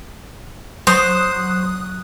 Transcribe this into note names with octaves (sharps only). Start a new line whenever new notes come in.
F#3 C5 D#6 F#6